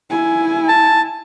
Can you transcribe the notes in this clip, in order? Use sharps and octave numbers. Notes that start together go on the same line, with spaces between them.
E4 G#5
A5